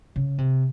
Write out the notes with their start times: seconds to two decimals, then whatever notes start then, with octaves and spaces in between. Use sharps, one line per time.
0.16 C#3
0.38 C3